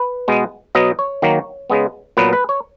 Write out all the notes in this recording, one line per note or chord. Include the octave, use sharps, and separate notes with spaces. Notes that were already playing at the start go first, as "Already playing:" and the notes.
Already playing: B4
B2 G#3 B3
B2 F#3 B3 D#5
C#5
D#3 F#3 A#3
C#3 G#3 B3
A#2 F#3 B3 B4
B4
C#5